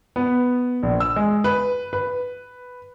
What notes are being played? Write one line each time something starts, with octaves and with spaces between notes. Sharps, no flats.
B3
A#1
E6
G#3
B4
B4